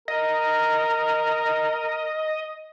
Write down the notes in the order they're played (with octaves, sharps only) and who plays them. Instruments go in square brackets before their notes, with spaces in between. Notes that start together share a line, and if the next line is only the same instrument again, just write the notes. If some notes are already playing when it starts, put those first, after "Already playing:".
[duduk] A#4 [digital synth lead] D#5